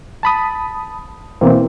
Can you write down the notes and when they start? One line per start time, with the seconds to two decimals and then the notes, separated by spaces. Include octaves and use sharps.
0.23 A5 B5 D#6
1.41 B2 E3 A#3 C4